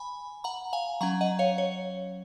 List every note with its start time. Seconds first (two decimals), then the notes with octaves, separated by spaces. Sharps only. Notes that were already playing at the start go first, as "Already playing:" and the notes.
Already playing: G#5 B5
0.44 F#5 A#5
0.73 F5 G#5
1.01 F#3 C#4 F#5 A#5
1.21 D#5 F#5
1.39 C#5 F5
1.58 C#5